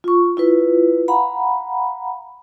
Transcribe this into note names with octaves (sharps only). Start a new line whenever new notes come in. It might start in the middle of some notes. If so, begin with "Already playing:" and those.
F4 C#6
E4 F4 B4
F5 F#5 A#5 B5